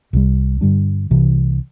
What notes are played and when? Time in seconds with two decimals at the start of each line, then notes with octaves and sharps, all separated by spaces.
0.13 C2 C3 E3 G3
0.61 G2 D3 G3 D4
1.10 C2 C3 E3